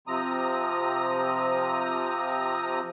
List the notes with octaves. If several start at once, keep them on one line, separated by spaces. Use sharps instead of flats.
C3 F3 C4 A#5 D#6